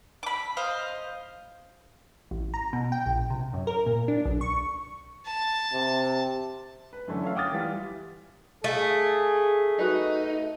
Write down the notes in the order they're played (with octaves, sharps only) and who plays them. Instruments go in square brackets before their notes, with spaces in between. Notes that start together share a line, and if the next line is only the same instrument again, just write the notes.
[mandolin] B5 D6
C5 D#5 F5
[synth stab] A1
A#5
B2
G5
A#1
C3
F#2
A#4
A#2
D4
B1
C#6
[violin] A5
[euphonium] C3
[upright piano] B4
F#2 D3 E3 A3 C#4 D4
F4 A4 C#5 E5 F5
F#5 G5 D6 D#6 F6 A6
E3 G3 F4
[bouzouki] A3 [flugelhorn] G#4 [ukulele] F5 G#5
[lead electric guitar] D#4 [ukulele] F#4 B4 D#5